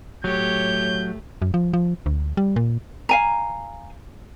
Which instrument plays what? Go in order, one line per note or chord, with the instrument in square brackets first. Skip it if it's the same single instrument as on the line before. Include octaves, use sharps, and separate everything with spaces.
[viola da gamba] A2 A3 [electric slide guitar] F#3 [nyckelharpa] G4 C#5 [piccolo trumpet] G6
[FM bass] F#2
F3
F3
D2
G3
A#2
[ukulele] F5 G#5 A#5